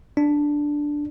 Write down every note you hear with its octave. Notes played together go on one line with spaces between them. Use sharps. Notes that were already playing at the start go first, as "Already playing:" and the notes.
D4